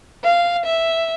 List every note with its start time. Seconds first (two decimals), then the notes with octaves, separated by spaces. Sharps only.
0.24 F5
0.65 E5